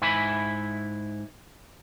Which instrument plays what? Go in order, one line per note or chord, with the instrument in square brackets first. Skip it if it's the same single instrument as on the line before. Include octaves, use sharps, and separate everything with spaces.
[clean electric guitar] G#2 E4 E5 G#5 B5